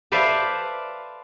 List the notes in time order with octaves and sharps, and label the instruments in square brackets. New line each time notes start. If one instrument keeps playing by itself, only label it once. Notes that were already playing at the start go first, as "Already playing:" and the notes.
[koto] A4 B4 C5 D5 E5 F5